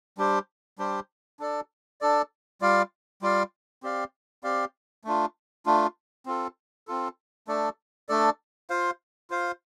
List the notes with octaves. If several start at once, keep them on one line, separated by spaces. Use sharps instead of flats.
G3 D4 G4 C5
G3 D4 G4 C5
D4 A4 D5
D4 A4 D5
G3 F4 D5 F5
G3 F4 D5 F5
C4 G4 D5 F5
C4 G4 D5 F5
A3 D4 F4
A3 D4 F4
C4 F4 A4
C4 F4 A4
A3 D4 A4 D5
A3 D4 A4 D5
F4 C5 F5
F4 C5 F5